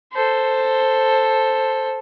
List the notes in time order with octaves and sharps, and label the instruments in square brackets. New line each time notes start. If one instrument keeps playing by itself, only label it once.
[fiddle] A4 C5